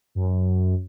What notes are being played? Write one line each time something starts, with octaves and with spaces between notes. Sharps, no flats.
F#2